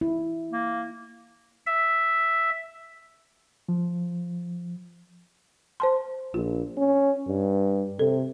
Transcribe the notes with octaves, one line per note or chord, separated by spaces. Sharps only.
E4
A#3
E5
F3
C5 A5 C6
A#1 F4
C#4
G2
C3 A4